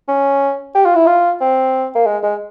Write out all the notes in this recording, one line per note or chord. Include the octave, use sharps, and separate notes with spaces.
C#4
G4
F4
E4
F4
C4
A#3
G#3
G#3